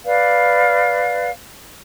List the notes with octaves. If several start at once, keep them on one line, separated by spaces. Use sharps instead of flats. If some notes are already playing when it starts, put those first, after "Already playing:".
B4 D5 F5